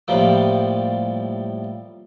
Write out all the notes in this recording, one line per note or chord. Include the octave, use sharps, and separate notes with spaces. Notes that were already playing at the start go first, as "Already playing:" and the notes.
A2 F3 G3 A#3